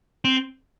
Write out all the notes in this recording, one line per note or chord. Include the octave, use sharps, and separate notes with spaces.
C4